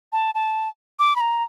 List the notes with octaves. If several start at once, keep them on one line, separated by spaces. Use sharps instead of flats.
A5
A5
D6
B5
A#5